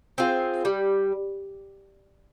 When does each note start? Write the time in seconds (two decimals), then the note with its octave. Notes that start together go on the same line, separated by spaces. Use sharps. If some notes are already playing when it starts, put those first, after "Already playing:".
0.18 C4 F4 G#4
0.65 G3